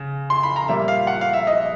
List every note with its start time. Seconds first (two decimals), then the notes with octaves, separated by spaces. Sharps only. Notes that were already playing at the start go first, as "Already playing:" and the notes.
Already playing: C#3
0.30 C6
0.43 B5
0.56 A#5
0.68 A#2 G3 A#3 E5
0.88 F5
1.07 F#5
1.21 F5
1.33 E5
1.47 D#5